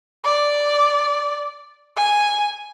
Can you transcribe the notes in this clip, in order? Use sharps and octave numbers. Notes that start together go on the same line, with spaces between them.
D5
G#5